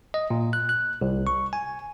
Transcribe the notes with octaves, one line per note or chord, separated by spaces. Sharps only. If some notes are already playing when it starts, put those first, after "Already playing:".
D#5
A#2
F#6
F#6
C2
C#6
G#5